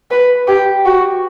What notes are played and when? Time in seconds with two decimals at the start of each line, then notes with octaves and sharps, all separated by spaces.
0.11 B4
0.48 G4
0.86 F#4